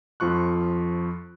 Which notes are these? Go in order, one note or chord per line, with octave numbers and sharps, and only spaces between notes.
F2 F3 F4 C#6 F#6